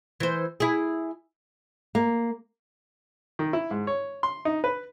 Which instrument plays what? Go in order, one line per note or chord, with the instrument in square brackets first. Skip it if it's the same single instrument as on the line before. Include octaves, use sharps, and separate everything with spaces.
[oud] E3 C5
E4 G#4
[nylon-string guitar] A#3
[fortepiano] D#3
E4
G#2
C#5
C6
D#4
B4